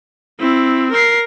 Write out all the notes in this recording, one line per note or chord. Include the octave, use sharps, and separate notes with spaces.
C4 E4
A#4 C7